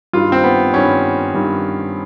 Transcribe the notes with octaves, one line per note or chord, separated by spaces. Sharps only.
G2 D#3 F4
C4
B3
G2 D#3 C#4
G2 D#3